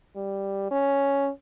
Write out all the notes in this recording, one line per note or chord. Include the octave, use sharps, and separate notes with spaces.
G3
C#4